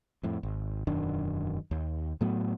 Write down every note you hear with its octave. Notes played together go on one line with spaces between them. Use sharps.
F2 A2
G#1
E1 F#2 D#3 D4
D#2
A2 F#3 A3 B3